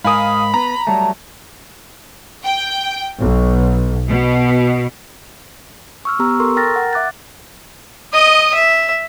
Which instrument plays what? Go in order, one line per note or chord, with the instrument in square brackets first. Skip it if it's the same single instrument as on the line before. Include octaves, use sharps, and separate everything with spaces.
[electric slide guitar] G#2 A#4 [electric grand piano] F5 G#5 D#6 [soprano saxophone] B5
[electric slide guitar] B3 B4 [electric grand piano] A#5
[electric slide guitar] F#3 G3 A3 [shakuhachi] A5
[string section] G5
B1
B2
[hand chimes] C#6 E6 F6
B3 G4 A#5 E6
A4 A#4 C6 C#6 E6
A#4 G5 A#5 F6 A6 A#6
F#5
E5 D6 F#6 A6
[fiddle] D#5 D#6
E5